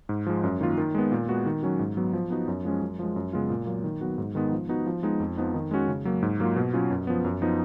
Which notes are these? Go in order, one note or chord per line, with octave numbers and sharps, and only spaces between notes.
G#2
F3 G#3
F#2
D#3 A#3 F4
D#3
G#3 B3
A#2
G#3 B3 F#4
D#3
F#3 C#4 F#4
G#2
F#3 B3
F3
B3 D#4 F#4
F#2
F3 G#3 C#4
F#2
F3 G#3
F#2
C#3 G#3 B3 F4
A#2
F#3 A#3
D#3
F#3 B3 F#4
G#2
D#3 G#3 B3 D#4
F3
B3 D#4 F#4
F3
G#3 B3 D#4
F2
F3 B3 D#4
D#3
G#3 C#4 F#4
C#3
F#3 A#3
G#2
F#3 A#3 F4
B2
F#3 C#4 F4
F#2
F3 B3
F#2
F3 B3 D#4